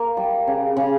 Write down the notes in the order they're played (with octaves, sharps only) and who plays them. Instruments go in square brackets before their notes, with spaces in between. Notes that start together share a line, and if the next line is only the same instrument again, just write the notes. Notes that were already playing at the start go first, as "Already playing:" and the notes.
Already playing: [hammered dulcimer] A#3
G3
C#3
C#3